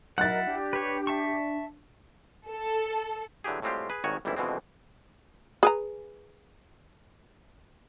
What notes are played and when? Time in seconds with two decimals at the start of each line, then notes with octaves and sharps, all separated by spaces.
0.18 F#3 E4 A#4 D#5 F#5 F#6 A6
0.47 D4 G4
0.73 B4 C#5
1.07 E5 A5 C#6
2.50 A4
3.44 D3 E3 F#3 G4 G#4
3.62 A2 G3 G#3 C4 F4 G4
3.90 G#4 B4
4.04 G#1 G2 D#3 F#4 C#5 G#5
4.25 G1 C#2 E3 G3 C4 E4
4.36 F2 B2 D3 E3 G#3 C4
5.63 G#4 B4 A#5